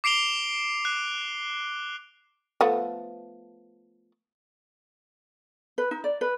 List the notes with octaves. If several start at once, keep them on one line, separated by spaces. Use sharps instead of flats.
D6 C7 D7 F7 G7
F#6
F3 A3 B3
B4
D#4
D5
B4